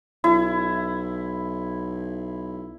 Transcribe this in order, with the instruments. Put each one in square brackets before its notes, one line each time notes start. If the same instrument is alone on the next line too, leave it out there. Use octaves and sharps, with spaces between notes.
[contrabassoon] B1 [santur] E4